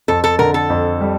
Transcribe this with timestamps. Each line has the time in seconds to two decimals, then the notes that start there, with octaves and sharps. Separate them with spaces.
0.08 F2 A4
0.24 A4
0.39 D3 A#4
0.54 A4
0.70 F2
1.01 G3